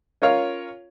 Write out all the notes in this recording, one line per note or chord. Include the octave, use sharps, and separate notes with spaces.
C#4 F4 A#4 C#5 F5